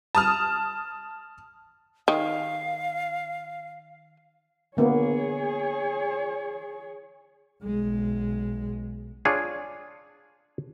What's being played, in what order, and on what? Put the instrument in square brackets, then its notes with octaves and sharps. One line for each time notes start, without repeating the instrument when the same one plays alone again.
[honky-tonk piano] A5 D#6 F6
[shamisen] D#3 [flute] F5
[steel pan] D3 A#3 B3 [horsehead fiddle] G#4 C#5
[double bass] B1 G#3
[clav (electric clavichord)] D4 F4 G#4 C#5